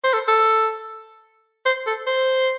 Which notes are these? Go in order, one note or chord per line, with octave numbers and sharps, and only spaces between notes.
C5
A4
A4
C5
A4
C5